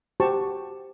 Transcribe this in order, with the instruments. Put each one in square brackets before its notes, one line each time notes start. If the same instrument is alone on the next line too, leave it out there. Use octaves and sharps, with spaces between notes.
[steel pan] F#4 G4 C5 A5 C#6